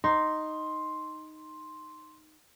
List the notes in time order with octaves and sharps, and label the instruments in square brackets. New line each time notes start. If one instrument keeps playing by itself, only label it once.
[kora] D#4 [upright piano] C6